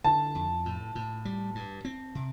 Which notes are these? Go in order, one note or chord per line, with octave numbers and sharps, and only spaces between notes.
D3 A5
F2
A2
A2
G3
G2
C4
C3